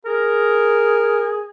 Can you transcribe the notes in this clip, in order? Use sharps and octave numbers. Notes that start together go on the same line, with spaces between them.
G#4 A#4